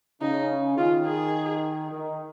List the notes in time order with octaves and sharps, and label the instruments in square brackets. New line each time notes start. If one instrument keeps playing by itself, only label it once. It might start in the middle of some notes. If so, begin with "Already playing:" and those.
[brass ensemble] C#3 C#4 [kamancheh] D#4
[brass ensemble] D#3 D#4 [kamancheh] F4
[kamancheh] G#4
[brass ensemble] D#3 D#4